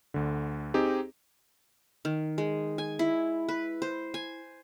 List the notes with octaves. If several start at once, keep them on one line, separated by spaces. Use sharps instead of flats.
D2 D3
C4 D#4 G4 G#4
D#3
G#3
G#5
E4
B4
C5
G#5